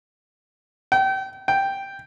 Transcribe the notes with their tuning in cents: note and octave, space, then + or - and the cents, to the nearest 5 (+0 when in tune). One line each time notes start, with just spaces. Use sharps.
G5 -30
G5 +0